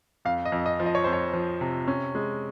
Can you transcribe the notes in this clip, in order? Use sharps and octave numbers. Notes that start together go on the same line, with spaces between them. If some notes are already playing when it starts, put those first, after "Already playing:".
F2 F5
D#5
F2
D#5
F3
D#5
C#5
F2 C5
C#5
F3
C3
C#4
G#3